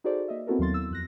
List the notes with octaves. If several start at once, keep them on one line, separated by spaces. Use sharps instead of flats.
D#4 F#4 G#4 A4 C5 D5
A#3 D#5 E5
B3 C4 E4 F#4 A4 A#4
D#2 F#3 F5 C6 A6
E6
F2 F#6 A#6